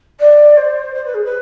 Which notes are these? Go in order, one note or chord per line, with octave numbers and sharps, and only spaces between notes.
D5
C5
C5
B4
G#4
B4